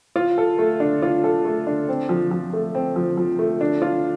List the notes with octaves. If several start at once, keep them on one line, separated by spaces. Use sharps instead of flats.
F4
A4
A3
D4
F4
A4
A3
D4
C4
F3
F3
A3
C4
F3
F3
A3
D4
F4